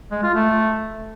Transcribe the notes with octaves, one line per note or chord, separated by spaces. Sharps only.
G#3
F4
A3